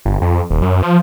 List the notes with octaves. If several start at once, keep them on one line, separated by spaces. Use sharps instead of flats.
G1
F2
D#1
F#2
F3